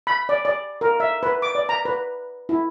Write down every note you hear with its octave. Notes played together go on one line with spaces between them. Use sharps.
B5
D5
D5
A#4
E5
B4
D6
D5
A#5
B4
E4